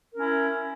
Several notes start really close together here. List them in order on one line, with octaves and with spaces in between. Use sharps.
A#4 C#4 E4